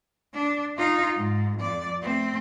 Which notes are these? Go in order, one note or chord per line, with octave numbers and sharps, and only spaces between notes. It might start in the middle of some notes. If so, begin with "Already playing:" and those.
D4
D#4 F4
G#2
F2 D5
A3 C4